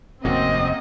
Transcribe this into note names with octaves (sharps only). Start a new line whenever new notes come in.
F1 D#2 G#2 A#3 C4 C#4 F#4 D#5